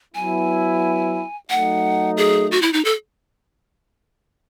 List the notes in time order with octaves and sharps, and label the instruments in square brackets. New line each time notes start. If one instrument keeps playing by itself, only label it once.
[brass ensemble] F#3 B3 E4 [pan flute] G#5
[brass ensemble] F#3 A3 D#4 [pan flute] F#5
[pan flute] G#4
F#4
E4
D#4
A4